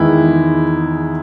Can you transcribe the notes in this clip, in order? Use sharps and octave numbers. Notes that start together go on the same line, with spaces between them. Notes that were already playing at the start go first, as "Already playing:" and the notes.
Already playing: E2 D#3 G#3 B3 E4